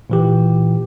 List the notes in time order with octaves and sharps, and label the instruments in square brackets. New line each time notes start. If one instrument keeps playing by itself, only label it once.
[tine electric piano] A#2 E3 G4